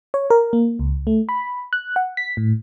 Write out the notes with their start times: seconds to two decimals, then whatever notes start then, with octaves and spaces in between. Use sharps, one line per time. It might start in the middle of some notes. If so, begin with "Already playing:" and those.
0.14 C#5
0.30 A#4
0.53 A#3
0.79 C#2
1.07 A3
1.29 B5
1.73 F#6
1.96 F#5
2.17 B6
2.37 A2